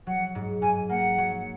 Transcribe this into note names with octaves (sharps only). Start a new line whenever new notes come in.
F#3 F#5
G#2
G#2 G#5
A#3 F#5
F#3